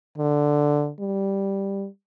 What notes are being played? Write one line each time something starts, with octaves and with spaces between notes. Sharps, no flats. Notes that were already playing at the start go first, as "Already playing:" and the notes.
D3
G3